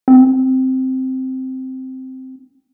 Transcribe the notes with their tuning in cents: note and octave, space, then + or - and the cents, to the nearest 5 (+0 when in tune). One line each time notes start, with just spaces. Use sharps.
C4 -5